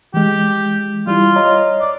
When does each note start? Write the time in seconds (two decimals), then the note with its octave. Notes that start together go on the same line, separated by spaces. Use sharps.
0.14 E3 G#3 G4
1.07 G3 E4 F4
1.36 C#5 D#5 A#5
1.81 D5